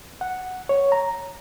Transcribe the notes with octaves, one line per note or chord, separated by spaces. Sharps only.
F#5
C#5
A#5